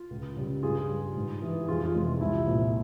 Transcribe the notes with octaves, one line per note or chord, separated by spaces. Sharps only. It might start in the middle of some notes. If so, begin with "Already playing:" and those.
Already playing: F4
C#2
C#3 G3
G2 F4 G#4
G3
G#2
E3 G3
F2 F4 G#4
F4
C3 E3 G#3
F4
C2 E4
A#2 F3 G#3